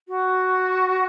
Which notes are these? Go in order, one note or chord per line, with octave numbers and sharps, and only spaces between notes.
F#4